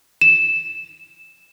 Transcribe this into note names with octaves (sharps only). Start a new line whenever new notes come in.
E7